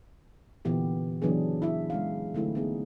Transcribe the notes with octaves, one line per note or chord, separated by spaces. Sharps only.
A#2 D3 E3 B3 G4
C#3 E3 F#3 B3 D4 G#4
E4 E5
G#3 C#4 F5
D3 F#3 A3 C4 D#4 E4
B3 C#4 D#4 G#4